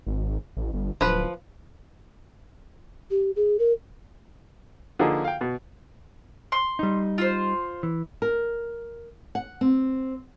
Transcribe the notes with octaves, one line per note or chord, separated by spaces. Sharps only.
G#1
A1
G1
D1 F3 B4
G4
G#4
A#4
D3 F3 A#3 D#4 G#4
F5 G5
B2
C6
G3 D#4
F4 C5
E3
A#4
F#5
C4